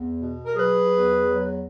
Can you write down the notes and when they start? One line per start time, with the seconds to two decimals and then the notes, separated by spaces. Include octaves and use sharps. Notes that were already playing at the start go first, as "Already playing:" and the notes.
Already playing: E2
0.20 B2
0.46 A#4
0.55 F#3 G#4 B4
0.91 E2
1.27 F#3